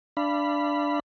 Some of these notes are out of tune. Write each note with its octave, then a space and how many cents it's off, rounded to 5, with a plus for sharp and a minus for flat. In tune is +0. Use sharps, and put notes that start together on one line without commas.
D4 +0 F5 -35 B5 -5